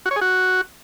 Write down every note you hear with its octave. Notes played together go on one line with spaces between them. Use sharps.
F#4
C#5
G#4
F#4